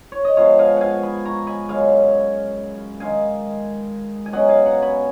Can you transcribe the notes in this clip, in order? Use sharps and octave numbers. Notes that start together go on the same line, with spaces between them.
C#5
D#5
G#2 F3 B3 C#5 F5
F5 G#5
F5 F#5 G#5
G#5 B5
A#5 C#6
G#5 B5
F#2 C#3 G#3 F5 G#5
D#3 G#3 D#4 F5 G#5
G#5
B2 F#3 C#4 D#5 F#5
F5 G#5
F#5 A#5
G#5 B5